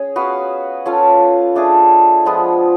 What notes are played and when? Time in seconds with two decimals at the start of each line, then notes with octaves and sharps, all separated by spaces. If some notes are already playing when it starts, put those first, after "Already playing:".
Already playing: C#4 G#4 C#5
0.16 B3 F#4 B4 F5
0.86 C#4 F4 A4 F5
1.55 A3 D4 G#4
2.25 F3 G#3 B3 F4